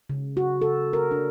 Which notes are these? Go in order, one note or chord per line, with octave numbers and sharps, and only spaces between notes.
C#3
F#4
A4
A#4
D4